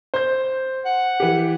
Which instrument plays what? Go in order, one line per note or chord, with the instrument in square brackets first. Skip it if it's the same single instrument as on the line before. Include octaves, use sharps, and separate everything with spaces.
[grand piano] C5 G6
[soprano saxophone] F#5
[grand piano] E3 G4